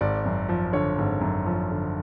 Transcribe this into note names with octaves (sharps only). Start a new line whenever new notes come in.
G#1 D5
F#2
F3
D3 C#5
G#1
F#2
F3
D3